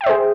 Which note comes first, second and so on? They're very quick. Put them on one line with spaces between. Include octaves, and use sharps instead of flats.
G5 E5 C5 G#4